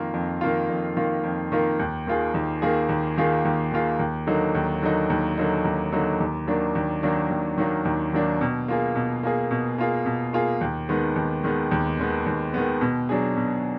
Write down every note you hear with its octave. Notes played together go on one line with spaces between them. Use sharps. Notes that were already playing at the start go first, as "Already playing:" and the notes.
Already playing: F2 D#3 A#3 F4
F2
D#3 A#3 F4
F2
D#3 A#3 F4
F2
D#3 A#3 F4
D#2
D#3 A#3 F4 G#4
D#2
D#3 A#3 F4 G#4
D#2
D#3 A#3 F4 G#4
D#2
D#3 A#3 F4 G#4
D#2
D3 F#3 A#3 D#4
D#2
D3 F#3 A#3 D#4
D#2
D3 F#3 A#3 D#4
D#2
D3 F#3 A#3 D#4
D#2
D#3 F#3 A#3 D4
D#2
D#3 F#3 A#3 D4
D#2
D#3 F#3 A#3 D4
D#2
D#3 F#3 A#3 D4
B2
A#3 F4 G#4
B2
A#3 F4 G#4
B2
A#3 F4 G#4
B2
A#3 F4 G#4
D#2
D#3 G#3 B3
D#2
D#3 G#3 B3
D#2
D#3 G#3 B3
D#2
D#3 G#3 B3
B2
F#3 D4 G#4
B2